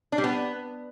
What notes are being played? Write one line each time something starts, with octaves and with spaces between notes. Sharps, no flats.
D4
G3
B3